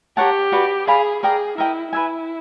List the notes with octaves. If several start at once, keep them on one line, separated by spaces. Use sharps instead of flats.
G4 A#4 C#5 F#5 A5
F#4 B4 D5
G#4 D5 F5 G#5 B5
G#4 A#4 D5 G5 A#5
E4 A#4 D#5 G5
E4 B4 E5 G#5